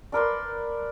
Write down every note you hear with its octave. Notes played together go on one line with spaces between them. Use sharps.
D4 A#4 B4 C6